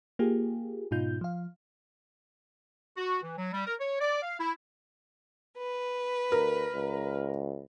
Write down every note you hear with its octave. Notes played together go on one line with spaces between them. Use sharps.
A#3 F4 G4 G#4
G#2 B2 D#4 F4 G6
F3 F5
F#4
E3
F#3
G3
A#4
C#5
D5
F5
E4
B4
D2 A#4
C#2